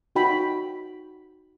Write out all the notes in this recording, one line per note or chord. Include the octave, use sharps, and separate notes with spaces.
D#4 F#4 G5 B5